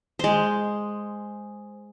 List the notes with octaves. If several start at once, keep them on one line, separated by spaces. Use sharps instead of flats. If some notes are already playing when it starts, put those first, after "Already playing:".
G#3 C5